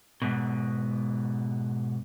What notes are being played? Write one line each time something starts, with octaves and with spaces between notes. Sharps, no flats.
G#2 B2